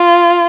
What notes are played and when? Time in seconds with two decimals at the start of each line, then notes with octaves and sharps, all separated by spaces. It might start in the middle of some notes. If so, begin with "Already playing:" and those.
Already playing: F4